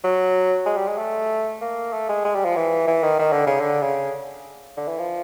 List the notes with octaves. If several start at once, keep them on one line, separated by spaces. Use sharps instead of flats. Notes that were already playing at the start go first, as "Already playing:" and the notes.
F#3
G#3
G3
G#3
A3
A#3
A3
G#3
G#3
G3
F3
E3
E3
D#3
D#3
D3
C#3
D3
C#3
D3
E3
F3